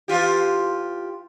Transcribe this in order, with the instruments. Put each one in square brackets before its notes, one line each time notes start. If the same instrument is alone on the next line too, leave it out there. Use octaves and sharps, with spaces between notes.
[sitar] E3 F4 G4